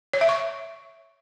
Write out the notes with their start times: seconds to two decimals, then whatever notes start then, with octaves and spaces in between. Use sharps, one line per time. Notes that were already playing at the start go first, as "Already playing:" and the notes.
0.14 C#5
0.21 E5
0.29 C#6